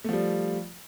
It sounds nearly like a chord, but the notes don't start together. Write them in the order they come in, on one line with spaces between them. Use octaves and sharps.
A3 F3 G3